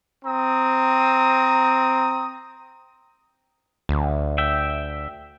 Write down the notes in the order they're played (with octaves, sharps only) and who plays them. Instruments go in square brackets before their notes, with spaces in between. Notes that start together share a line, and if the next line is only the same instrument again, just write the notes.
[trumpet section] C4 A#5 D#6
[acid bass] D2
[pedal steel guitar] E5 G5